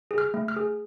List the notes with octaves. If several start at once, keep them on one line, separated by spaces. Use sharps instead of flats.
G#4
F6
A3
F6
G#4